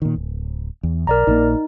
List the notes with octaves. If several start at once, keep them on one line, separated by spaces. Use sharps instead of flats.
A#2 D#3
D1
E2
B1 A#4 D5 A#5
A#1 F#3 A#3 D#4